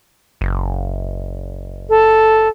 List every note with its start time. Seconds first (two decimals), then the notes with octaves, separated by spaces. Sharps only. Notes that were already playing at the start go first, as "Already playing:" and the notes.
0.41 F#1
1.89 A4